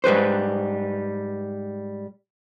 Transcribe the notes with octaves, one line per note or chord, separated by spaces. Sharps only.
G#2 G3 B4 C5